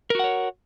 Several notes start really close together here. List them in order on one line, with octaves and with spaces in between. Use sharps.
A#4 F#4 F#5 C#5